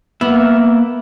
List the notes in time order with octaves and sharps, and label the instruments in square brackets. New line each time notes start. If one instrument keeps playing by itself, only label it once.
[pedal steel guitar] A#3 E5 [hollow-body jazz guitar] B3